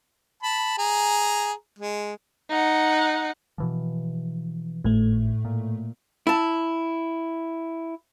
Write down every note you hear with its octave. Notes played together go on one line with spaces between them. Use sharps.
A5 B5
G#4 A#5
G#3
D#4 F#5
B2 E3 F3
G#1 A2 A3
A#2
E4 A5